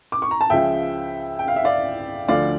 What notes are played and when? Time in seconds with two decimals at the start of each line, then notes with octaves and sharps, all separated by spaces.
0.12 D6
0.22 C#6
0.31 A#5
0.41 A5
0.50 C#2 C#3 F3 E5 G5
1.39 G5
1.48 F5
1.56 E5
1.64 D5 F5
2.28 D2 D3 F3 D5 F5